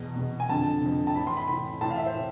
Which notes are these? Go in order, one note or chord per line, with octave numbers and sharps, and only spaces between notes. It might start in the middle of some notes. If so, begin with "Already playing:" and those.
Already playing: E2 B2
E2 B2
G#5
F2 D3 A5
F2 D3
A5
A2 E3 B5
C6
B5
A2 E3 B5
A2 E3 A5
F5
E5
C5
A2